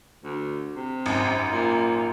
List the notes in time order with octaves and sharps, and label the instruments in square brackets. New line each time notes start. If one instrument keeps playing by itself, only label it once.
[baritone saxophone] D2
C3
[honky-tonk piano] G#1 F#2
[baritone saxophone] A#2